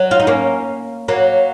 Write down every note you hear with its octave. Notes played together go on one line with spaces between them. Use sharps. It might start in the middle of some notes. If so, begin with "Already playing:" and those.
Already playing: F#3
F4
D#4
A#3 C#4
F#3 A#3